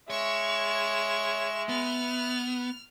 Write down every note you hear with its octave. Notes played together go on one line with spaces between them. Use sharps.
G#3 C#5 E5 C#6 E7
B3 F6 F7